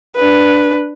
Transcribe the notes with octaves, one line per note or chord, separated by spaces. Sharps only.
D4 B4